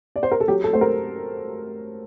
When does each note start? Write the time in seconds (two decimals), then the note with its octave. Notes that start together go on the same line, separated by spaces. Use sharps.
0.16 D5
0.23 C5
0.31 A#4
0.40 A4
0.48 F#3 G4
0.64 A4
0.73 A3 C5
0.81 A#4